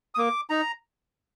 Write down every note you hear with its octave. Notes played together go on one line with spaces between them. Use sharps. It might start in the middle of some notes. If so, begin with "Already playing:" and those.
D#6
A#3 D6
D#4 A#5